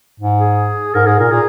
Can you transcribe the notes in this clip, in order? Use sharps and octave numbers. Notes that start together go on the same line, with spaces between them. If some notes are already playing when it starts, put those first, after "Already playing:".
G#2
G#4
G#2 A#4
G#2 G#4
A#2 A#4
A#2 G#4